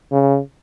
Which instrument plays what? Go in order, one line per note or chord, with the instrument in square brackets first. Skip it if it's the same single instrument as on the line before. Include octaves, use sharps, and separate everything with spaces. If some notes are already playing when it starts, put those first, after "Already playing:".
[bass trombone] C#3